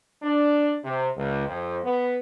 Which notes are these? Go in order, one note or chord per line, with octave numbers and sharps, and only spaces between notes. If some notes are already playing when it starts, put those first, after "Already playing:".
D4
C3
C#2
F2
B3